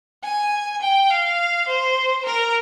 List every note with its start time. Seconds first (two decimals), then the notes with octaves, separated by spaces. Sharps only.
0.23 G#5
0.82 G5
1.10 F5
1.68 C5
2.26 A#4